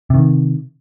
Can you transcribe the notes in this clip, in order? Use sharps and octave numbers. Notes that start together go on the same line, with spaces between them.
C3 D#3